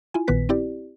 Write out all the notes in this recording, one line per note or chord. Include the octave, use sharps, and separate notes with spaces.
E4 F4 G#5
A#1 A#2 D#3 B3 B4 B6
C4 E4 G4 D5